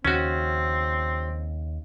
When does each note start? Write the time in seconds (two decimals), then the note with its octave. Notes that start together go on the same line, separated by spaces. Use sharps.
0.05 D#2 C#3 C4 C#4 F#4